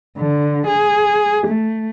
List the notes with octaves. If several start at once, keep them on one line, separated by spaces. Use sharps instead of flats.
D3
G#4
A3